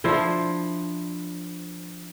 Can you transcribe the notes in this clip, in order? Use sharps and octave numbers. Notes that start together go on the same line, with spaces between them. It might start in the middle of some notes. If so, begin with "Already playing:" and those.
F3 D4 E4 C5